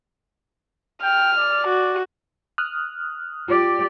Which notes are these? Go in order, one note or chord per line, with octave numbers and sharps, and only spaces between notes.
G5 F6
D5
F#4
D#6 F6 F#6
F4 G4 D5